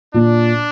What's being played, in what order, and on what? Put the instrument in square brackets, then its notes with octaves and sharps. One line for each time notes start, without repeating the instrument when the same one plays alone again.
[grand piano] A#2 [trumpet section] D4